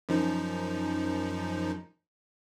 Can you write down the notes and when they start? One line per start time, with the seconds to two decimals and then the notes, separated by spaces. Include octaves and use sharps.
0.09 F#2 F3 D#4